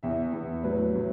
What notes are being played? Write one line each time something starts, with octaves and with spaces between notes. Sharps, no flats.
E2 E3 E5
E2 E3
A2 F#3 B4
A2 F#3